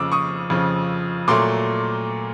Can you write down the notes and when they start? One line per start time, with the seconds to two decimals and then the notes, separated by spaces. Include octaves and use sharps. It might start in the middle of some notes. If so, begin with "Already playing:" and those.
Already playing: F2 C#3 F3 D6 E6
0.12 C#6 D#6
0.50 F2 C#3 F3
1.28 A#2 F#3 A3 C6 D6